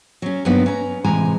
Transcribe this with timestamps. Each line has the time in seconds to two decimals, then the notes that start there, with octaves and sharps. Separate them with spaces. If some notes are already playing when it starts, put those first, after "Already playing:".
0.22 F#3 C#4
0.45 G2 F3 F#3 A#3 B3 D#4
0.66 C#4 A#5
1.04 A2 C3 E3 G#3 G#5 A#5